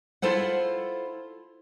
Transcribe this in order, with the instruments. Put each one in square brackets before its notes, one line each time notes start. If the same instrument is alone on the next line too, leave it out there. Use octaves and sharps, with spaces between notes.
[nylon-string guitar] E4 F4 A4 C5 F#5